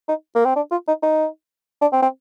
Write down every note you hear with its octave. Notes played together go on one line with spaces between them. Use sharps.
D#4
A#3
C4
D4
F4
D#4
D#4
D4
C4
C4